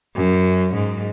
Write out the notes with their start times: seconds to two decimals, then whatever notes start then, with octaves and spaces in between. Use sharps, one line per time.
0.16 F#2
0.75 G#2